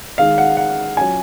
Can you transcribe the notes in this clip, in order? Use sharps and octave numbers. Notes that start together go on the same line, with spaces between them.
D#3 G#3 D#4 F5
F#5
F#5
F#3 C#4 F4 G#5